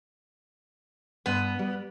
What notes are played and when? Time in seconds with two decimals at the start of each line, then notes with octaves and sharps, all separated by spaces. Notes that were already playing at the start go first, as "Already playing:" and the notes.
1.26 G2 B3
1.59 G3